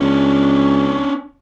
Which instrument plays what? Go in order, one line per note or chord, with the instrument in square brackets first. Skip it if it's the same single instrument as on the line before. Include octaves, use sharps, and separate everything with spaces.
[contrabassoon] C#2 [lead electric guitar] C#4 D4